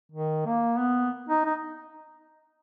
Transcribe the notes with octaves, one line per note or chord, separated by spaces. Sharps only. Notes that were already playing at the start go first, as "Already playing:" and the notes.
D#3
A#3
B3
D#4
D#4